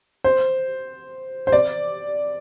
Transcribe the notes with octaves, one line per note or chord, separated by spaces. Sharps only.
C5
C5
D5